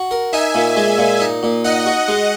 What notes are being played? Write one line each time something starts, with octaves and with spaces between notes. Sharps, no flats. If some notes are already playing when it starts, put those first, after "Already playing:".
Already playing: F#4
A#4
D#4 E5 G#5
A#2
G#3
A#2
D#4
A#2
D#4 D#5 F#5
F#4
G#3